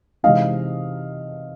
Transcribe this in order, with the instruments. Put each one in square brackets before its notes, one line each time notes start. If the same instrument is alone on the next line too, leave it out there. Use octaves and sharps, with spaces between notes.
[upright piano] C3 E3 G#3 C4 D#4 D#5 F5